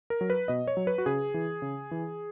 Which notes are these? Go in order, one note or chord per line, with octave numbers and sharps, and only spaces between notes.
A#4
F#3
B4
B2 D#5
C#5
F#3
B4
F#4
C#3 G#4
E3
C#3
E3